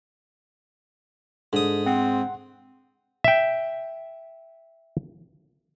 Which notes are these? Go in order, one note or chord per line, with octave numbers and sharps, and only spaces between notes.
G#2 D4 A4 D#6
C4 F#5 C6
E5 G5